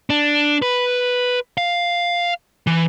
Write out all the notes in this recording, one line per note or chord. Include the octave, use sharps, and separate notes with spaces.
D4
B4
F5
E3